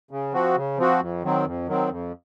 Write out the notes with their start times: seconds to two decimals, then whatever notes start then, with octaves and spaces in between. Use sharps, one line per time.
0.11 C#3
0.33 F3 C4 F#4
0.56 C#3
0.78 F3 C4 F#4
1.00 F2
1.23 D#3 F#3 C4
1.45 F2
1.68 D#3 F#3 C4
1.90 F2